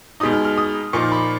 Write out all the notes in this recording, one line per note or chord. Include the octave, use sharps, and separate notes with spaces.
B2 G#3 D#4 D#6
F6
F6
D#6
A#2 F3 A#3 D#4 C#6
B5